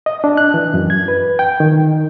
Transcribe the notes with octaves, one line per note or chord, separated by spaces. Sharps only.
D#5
D4
F#6
E3
F#2
G#6
B4
G5
D#3